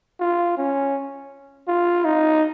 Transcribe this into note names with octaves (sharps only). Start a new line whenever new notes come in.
F4
C#4
F4
D#4